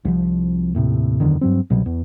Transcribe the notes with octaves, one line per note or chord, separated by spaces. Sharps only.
C2 F3
D#2 A2 C3
F#1 E2 D3 D#3
G2 F#3 C4
C2 B2 F#3
E2